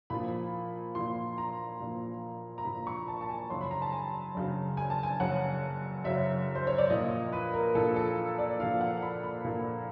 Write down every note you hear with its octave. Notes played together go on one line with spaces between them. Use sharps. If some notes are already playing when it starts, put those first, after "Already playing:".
A#2 F3 B5
A#2 F3 C6
A#5
A#2 F3
A#5
A#2 F3 B5
C#6
A5
A5
G#5
F#2 C#3 F#3 C6
B5
A#5
A5
G#5
F#2 C#3 F#3
G#5
A5
G#5
F#2 C#3 F#3 F#5
F#2 C#3 F#3 E5
C5
C#5
D5
A#2 F3 D#5
B4
A#4
A#2 F3 A4
A4
D5
A#2 F3 F5
F#5
B5
B5
A#2 F3